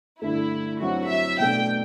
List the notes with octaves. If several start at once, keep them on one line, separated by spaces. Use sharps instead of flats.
G2 D3 A3 E4
G2 F#3 C4 E4 F#4
E5
B2 A3 D4 G5